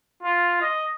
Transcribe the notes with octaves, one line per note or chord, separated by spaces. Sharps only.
F4
D#5